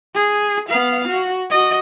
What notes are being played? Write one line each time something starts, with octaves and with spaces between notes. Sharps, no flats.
G#4
B3 F5
F#4
F#4 D#5